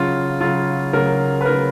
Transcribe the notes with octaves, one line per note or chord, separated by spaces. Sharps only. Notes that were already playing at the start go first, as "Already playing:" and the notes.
Already playing: C#3 F#3 F4
C#3 F#3 F4
C#3 F#3 A#4
B4
C#3 F#3 A#4